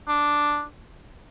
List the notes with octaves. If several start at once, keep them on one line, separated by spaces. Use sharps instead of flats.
D4